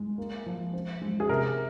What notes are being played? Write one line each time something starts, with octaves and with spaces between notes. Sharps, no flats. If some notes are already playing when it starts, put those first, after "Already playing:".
Already playing: G#3
A#3
F3
C4
G#3
G#4
C3 A#4